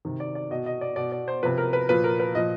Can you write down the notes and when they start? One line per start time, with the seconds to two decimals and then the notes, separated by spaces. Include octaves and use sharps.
0.05 C3 D#3
0.20 D5
0.35 D5
0.51 B2 D#5
0.66 D#5
0.81 D5
0.96 B2 D5
1.12 D5
1.28 C5
1.42 C3 F3 B4
1.58 A#4
1.73 B4
1.89 A#2 F3 B4
2.04 A#4
2.20 B4
2.35 A#2 F3 D#5